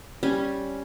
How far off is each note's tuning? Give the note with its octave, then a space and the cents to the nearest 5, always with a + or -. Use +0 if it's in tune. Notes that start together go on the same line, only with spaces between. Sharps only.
G3 +0 C#4 +0 G#5 +0